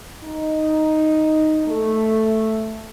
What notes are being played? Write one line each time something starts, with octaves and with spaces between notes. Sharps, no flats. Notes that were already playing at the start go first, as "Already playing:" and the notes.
D#4
A3